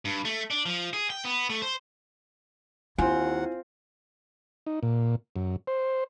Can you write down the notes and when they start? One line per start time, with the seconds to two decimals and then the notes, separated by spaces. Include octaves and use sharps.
0.05 G2
0.25 A3
0.50 D4
0.66 F3
0.93 G#4
1.10 G5
1.25 B3
1.50 A3
1.62 C5
2.98 D#2 C4 E4 F4 F#5 G#5
4.67 D#4
4.83 A#2
5.36 F#2
5.67 C5